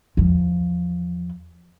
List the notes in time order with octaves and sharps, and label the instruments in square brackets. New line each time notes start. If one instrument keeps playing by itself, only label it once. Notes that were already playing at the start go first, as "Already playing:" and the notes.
[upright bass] E2 F3